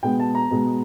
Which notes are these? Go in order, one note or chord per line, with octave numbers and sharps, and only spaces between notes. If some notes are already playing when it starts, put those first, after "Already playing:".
B2 G#3 B3 G5
A5
A#5
B2 G#3 B3